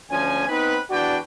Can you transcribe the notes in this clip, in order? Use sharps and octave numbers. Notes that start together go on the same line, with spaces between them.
D2 F3 C#4 G#5
B3 C4 D#4 B4
E2 D4 F#4 B4 D5 G5